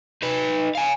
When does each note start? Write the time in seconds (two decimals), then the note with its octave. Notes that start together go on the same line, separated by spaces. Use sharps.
0.22 D#4 B4
0.75 F5 G#5